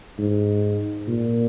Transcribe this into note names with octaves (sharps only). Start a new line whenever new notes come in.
G#2
A#2